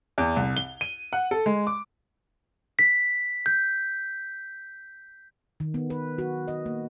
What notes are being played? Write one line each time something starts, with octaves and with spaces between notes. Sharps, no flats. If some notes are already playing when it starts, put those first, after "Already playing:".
E2
C2
G7
D#7
F#5
A4
G#3
D6
B6
G6
D#3
B3
B4
F#4
D#5
A#3